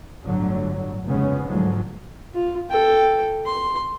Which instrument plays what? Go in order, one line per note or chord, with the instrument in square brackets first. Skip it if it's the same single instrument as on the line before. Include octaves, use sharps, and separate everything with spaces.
[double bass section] G1 A2 D3 F#3
F1 C#3 G#3 B3 C#4
D2 G#2 D3 F3 F#3 G#3
[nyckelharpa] F4
A4 G5
C6